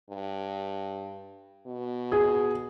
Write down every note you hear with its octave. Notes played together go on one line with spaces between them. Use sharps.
G2
B2
G#4